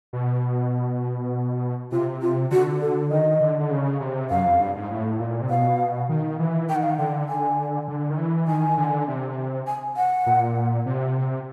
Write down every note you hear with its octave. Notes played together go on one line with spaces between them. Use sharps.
B2
C3 F4
F4
D3 F#4
A4
D#3 D#5
D3
D3
C#3
C3
F#2 F5
F2
G2
G#2
A2
A#2
C3
B2 F5
D#3
E3
D#3 G5
F#5
F5
F#5
D3 G5
G#5
D3
D#3
E3
D#3 G#5
D3
C3
G#5
F#5
A#2
C3